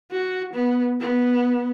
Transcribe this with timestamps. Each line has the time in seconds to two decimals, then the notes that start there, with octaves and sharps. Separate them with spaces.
0.11 F#4
0.54 B3
1.00 B3